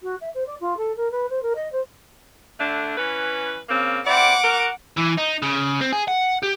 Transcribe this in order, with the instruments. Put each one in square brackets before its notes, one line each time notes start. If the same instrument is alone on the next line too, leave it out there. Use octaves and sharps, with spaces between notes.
[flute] F#4
E5
C5
D5
F4
A4
A#4
B4
C5
A#4
D#5
C5
[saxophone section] D3 A3 D4
E3 C#4 B4
C#3 A#3 C4
[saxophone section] C4 E4 D5 [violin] F#5 D6
[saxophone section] F#4 A#4
[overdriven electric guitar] E3
D#4
C#3
C4
G#4
F#5
G4